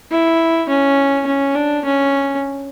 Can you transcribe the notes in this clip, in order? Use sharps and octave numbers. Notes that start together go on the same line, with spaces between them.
E4
C#4
C#4
D4
C#4